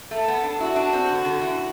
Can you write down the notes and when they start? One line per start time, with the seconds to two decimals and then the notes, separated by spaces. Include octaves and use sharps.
0.11 A3 A4
0.28 B3
0.43 D4
0.60 E4 F#4
0.76 D4
0.93 C4
1.09 D3
1.25 D3
1.41 E3